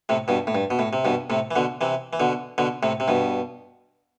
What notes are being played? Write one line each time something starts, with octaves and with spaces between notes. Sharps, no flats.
A2 C3
G2 B2
A2
G2
B2
A2
C3
G2 B2
A2 C3
E3
B2 D3
C3 E3
E3
B2 D3
B2 D3
A2 C3
C3
G2 B2